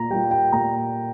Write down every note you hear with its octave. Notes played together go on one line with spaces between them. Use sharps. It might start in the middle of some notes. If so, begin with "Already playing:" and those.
Already playing: A#2 A#5
G3 A#3 F4 G5
G5
A#2 A#5